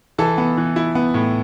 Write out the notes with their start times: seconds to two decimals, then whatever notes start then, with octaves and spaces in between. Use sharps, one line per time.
0.18 E3 A4 A5
0.38 B3
0.57 E3
0.76 E4
0.95 B3
1.14 A2